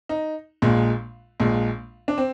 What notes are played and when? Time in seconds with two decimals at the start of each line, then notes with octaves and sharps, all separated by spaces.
0.09 D#4
0.62 A#1 A#2 G#3
1.40 A#1 A#2 G#3
2.08 D4
2.18 C4